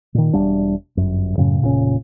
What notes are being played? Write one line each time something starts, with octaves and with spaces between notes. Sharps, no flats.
A#2 D#3
E1 G3 D4
G1 F#2
F#2 A2 C#3 C#4
F1 A#2 C#3 C#4